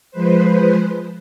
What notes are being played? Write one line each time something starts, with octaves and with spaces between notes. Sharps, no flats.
F3 G#3 B4 C5